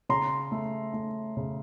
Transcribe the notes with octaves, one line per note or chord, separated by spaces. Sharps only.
C#3 A#5 C6
A3
A3
C#3